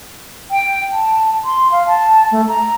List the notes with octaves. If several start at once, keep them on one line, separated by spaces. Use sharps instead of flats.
G5
A5
C6
F5
A5
A3
A#5